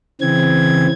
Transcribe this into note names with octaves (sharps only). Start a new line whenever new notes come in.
C#3 E3 C4 G#6